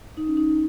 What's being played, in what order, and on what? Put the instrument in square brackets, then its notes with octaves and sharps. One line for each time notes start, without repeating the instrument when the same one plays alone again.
[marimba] D#4
C#4
D#4